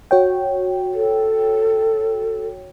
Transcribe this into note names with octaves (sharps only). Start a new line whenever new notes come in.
F#4 C#5 G5
A4